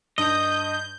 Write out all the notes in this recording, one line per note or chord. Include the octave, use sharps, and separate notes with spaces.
G2 D#5 G6